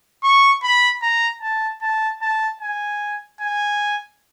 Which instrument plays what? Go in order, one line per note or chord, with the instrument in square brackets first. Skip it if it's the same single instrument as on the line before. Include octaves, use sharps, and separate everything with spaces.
[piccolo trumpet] C#6
B5
A#5
A5
A5
A5
G#5
G#5